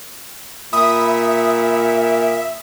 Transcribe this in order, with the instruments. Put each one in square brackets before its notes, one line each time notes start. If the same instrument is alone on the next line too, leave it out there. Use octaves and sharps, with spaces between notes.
[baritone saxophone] A#2 [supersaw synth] E5 [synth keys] B5 D#6